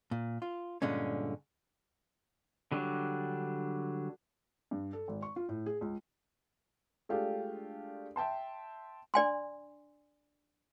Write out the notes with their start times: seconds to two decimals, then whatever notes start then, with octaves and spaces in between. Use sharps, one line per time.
0.11 A#2
0.42 F4
0.82 G2 A#2 D3 G#3 C#4
2.72 D3 F#3 G3 D4
4.71 G2
4.93 A4
5.08 G#1
5.22 C#6
5.36 F4
5.49 A2
5.66 G#4
5.81 C#2
7.09 G#3 A3 D4 F4 G4 A4
8.16 E5 G5 A5 C6
9.14 D4 D5 G#5 C6